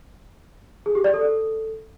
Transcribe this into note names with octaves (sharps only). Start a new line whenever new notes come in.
G#4
G4
D5
A4